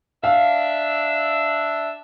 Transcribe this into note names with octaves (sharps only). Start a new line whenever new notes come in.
D4 E5 F5